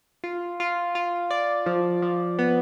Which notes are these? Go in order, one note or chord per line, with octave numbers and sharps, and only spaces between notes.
F4
F4
F4
D5
F3
F3
B3